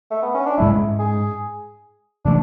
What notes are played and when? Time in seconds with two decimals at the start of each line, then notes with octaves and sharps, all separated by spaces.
0.11 A3
0.22 B3
0.35 C#4
0.46 D4
0.57 G#2 G#3 C#4 E4
0.99 G#4
2.25 C#3 E3 A3 D4